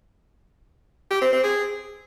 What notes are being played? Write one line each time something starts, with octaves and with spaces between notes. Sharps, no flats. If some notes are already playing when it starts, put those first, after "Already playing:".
G4
C4
C4
G#4